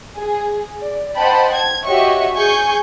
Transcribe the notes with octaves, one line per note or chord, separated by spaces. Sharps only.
G#4
D5
C5 D#5 F#5 G5 A5 B5
G#6
F#4 G4 C#5 D#5 E5 C#6
G#4 G#5 C#6 G6